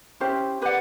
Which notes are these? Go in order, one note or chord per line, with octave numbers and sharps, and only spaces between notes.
C#4 E4 G4 C5
G4 B4 D5 F#5